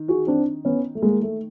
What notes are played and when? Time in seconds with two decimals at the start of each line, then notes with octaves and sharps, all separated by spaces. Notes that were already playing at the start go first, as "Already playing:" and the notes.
Already playing: D#3
0.08 F#4 G#4
0.27 C4 D4
0.65 B3 C#4
0.95 A3
1.02 G#3 A#3
1.22 A3